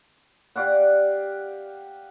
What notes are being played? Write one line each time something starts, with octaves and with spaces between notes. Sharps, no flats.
G4 D5 F5 F#5